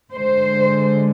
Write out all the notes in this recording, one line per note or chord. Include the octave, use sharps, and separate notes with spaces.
D3 G#3 C5